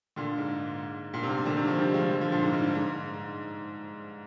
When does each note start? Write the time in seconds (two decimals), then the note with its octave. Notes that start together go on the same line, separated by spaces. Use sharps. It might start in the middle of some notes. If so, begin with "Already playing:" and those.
0.16 A#2 D3
0.38 G#2
1.13 G2 A#2
1.23 C3
1.29 G2 A#2
1.45 A#2 D3
1.57 C3 D#3
1.67 D3 F3
1.78 D#3 G3
1.94 F3 G#3
2.10 D3 F3
2.21 D3 F3
2.31 G2 A#2
2.43 G#2
2.53 G#2
2.64 G2
2.75 G#2